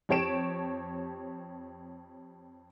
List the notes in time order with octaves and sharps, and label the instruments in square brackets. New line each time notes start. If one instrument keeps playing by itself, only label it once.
[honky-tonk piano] F2 G4 C#5 A5 D7 E7